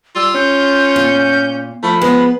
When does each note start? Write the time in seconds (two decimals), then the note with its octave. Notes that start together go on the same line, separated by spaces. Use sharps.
0.16 G3 F4 E6
0.35 C#4 G6
0.96 A#2 G6
1.83 F3 A3 B5
2.02 G#3 B3